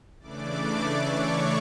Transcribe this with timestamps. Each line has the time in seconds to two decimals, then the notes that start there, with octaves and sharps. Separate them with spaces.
0.20 C#3 E3 A3 D4 D5 D6
1.06 C#5 C#6